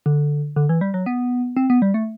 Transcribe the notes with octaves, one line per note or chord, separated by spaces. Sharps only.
D3
D3
E3
G3
F#3
B3
C4
B3
G3
A3